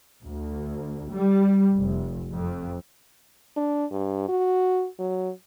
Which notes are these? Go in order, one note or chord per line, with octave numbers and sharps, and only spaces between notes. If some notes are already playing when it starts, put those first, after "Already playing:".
D2
G3
F1
F2
D4
G2
F#4
F#3